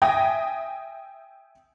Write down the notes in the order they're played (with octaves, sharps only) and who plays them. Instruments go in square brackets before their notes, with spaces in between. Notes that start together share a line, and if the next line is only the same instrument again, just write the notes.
[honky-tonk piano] E5 G5 G#5 D#6 G#6 A#6